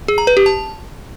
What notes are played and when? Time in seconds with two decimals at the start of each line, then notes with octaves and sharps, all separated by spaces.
0.08 G#4
0.18 A#5
0.27 B4
0.37 G4
0.46 A5